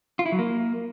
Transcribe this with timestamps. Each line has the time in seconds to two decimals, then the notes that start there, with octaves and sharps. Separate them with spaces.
0.19 F4
0.26 E4
0.32 F#3
0.39 A#3